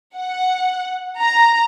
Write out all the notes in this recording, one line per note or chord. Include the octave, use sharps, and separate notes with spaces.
F#5
A#5